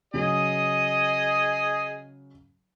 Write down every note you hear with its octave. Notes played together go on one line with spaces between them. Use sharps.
C#3 F#3 G#4 D#5